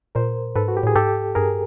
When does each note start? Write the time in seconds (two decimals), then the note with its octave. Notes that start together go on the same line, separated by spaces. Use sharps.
0.15 A#2 A#4 C5
0.56 G#2 A4 B4
0.68 F#4
0.77 G4
0.83 A2 G#4
0.95 G#2 G4 A4
1.35 G2 G#4 A#4